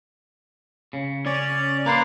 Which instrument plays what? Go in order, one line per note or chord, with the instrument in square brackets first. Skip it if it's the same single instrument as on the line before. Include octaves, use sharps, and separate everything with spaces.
[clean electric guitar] C#3
[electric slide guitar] C#4 C#5 [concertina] D5
[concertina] A#3 D6 [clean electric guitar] A#4 B4 C6